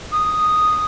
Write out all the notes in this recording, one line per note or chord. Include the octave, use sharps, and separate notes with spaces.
D#6